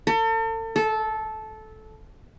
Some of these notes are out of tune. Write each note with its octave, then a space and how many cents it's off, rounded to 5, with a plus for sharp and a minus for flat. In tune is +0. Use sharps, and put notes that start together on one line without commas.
A4 +40
A4 -15